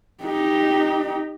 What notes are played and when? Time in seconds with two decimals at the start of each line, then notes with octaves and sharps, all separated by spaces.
0.24 D#4 G4